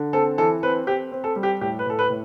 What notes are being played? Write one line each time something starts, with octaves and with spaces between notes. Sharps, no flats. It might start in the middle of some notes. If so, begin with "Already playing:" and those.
Already playing: D3
C4 A4
E3 A4
C4 B4
C4 G4
C4
A4
G3
G4
A2 G4
B4
A2 A4
B4
A2